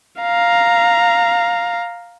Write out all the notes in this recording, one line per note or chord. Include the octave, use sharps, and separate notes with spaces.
F5 A#5